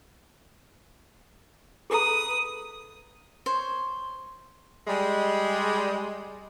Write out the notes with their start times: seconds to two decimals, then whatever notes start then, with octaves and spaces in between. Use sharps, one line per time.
1.90 G#4 A4 B4 A#5 D#6
3.46 C5 C#5
4.87 G3 G#3